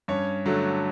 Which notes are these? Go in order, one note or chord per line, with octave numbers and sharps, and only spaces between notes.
G2 C#4 C#5
D3 F#3 A3